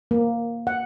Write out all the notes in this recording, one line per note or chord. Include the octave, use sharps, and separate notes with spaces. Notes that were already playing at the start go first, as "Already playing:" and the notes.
A#3
F#5